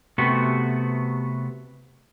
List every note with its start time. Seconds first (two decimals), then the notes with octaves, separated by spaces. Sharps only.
0.18 C3 A3 B3 F#4